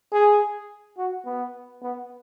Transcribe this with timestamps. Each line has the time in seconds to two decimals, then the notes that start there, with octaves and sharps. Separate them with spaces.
0.12 G#4
0.97 F#4
1.25 B3
1.82 B3